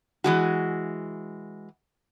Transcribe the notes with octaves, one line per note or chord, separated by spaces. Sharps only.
E3 G#3 F#4